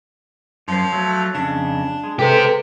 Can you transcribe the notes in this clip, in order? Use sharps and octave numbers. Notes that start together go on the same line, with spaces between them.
F#2 F3 C5
F#3 A3
F2 C#3 D4
G#3
G4 A4 B4 C5